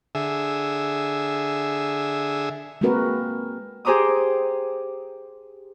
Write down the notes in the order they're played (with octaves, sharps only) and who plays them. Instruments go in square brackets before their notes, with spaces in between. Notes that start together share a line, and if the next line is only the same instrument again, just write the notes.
[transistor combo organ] D3 G#4 E5
[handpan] G#3 A#3 C4 F#4 A#4 B4
[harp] G4 G#4 C5 A#5 D6 D#6